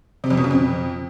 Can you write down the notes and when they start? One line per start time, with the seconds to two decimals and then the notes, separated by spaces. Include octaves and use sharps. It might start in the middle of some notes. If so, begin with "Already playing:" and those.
0.24 C3
0.30 F2
0.37 B2
0.44 C#3
0.51 F2